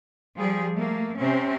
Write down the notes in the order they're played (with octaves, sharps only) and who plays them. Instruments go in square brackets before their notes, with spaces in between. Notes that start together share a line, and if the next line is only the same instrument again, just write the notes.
[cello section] F3 G3 G#4
A3 A#3
C3 C4 C#4